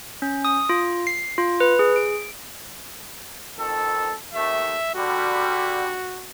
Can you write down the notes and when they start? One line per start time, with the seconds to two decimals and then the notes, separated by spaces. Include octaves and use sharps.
0.22 C#4
0.45 D#6
0.69 F4
1.07 C7
1.38 F4
1.60 B4
1.79 G#4
1.96 D7
3.57 F2 D#3 A4
4.34 D#2 A3 E5
4.95 D3 G3 F#4